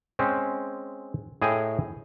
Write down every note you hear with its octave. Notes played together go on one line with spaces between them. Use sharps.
G#3 C4 C#4
A2 G#4 D#5 G5 G#5